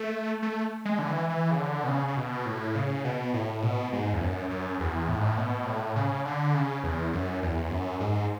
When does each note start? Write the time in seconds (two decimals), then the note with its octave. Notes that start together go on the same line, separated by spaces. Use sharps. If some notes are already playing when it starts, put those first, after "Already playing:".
Already playing: A3
0.42 A3
0.85 G#3
0.99 D3
1.08 E3
1.29 E3
1.51 C#3
1.58 D3
1.84 B2
1.88 C#3
2.08 C#3
2.17 B2
2.46 A2
2.75 C#3
3.04 B2
3.33 A2
3.63 B2
3.92 G#2
4.13 E2
4.20 F#2
4.50 F#2
4.80 E2
5.08 A2
5.18 G#2
5.25 A2
5.38 B2
5.66 A2
5.96 C#3
6.25 D3
6.54 C#3
6.84 E2
7.13 F#2
7.42 E2
7.71 F#2
8.00 G#2